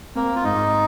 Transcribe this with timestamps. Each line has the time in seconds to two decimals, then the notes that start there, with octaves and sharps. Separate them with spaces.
0.15 A#3 C4
0.36 F4
0.44 G#2 D#4